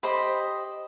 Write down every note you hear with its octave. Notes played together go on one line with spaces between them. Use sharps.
G4 C5 D#5 B5